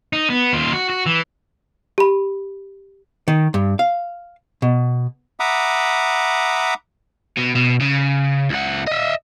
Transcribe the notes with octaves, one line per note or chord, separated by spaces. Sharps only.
D#4
B3
D#2 F4
F#4
F#4
E3
G4 B5
D#3
G2
F5
B2
E5 F#5 A#5 B5 D6 D#6
B2
B2
C#3
C#2 F#5
D#5 E5